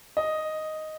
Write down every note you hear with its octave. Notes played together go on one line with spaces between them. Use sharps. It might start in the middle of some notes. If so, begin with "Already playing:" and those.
D#5